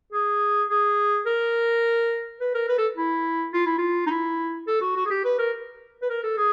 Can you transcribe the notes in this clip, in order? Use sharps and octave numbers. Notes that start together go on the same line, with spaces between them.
G#4
G#4
A#4
B4
A#4
B4
A4
E4
F4
E4
F4
D#4
E4
A4
F#4
F#4
G#4
G4
B4
A#4
B4
A#4
A4
G#4